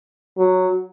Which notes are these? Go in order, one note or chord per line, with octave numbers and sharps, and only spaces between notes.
F#3